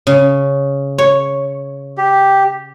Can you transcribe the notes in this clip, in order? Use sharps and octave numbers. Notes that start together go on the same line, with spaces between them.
C#3
C#5
G4